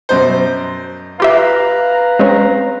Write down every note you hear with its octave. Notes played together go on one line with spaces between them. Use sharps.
F#2 B2 C5
F4 G4 B4 E5 F5 A#5
G#3 C4 C#4